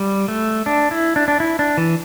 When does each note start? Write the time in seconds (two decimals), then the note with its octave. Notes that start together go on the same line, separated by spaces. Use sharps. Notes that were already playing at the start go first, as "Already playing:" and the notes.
Already playing: G3
0.28 A3
0.66 D4
0.91 E4
1.16 D4
1.28 D4
1.40 E4
1.59 D4
1.77 E3